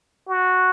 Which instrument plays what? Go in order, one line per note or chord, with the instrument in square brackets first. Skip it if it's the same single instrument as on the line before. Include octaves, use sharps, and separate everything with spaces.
[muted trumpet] F#4